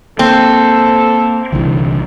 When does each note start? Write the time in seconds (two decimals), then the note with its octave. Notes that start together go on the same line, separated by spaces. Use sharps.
0.19 A#3 C4 A4
1.52 C2 D3 E3